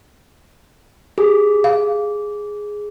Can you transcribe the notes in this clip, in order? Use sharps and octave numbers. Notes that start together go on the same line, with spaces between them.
G4 G#4
F5